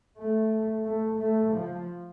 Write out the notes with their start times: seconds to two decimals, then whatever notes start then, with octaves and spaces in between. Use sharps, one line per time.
0.18 A3
0.85 A3
1.19 A3
1.53 F3